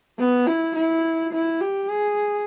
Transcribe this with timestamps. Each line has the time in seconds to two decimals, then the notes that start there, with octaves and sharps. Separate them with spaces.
0.18 B3
0.47 E4
0.75 E4
1.32 E4
1.61 G4
1.90 G#4